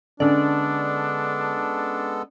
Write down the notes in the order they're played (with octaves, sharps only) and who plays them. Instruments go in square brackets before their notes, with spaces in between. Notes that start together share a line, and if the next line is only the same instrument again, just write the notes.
[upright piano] D3 [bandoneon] G#3 B3 A4 [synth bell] C#4 D5 [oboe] D4